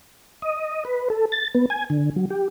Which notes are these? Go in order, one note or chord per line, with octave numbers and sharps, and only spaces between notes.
D#5
B4
A4
A6
B3
G#5
D3
F#3
G4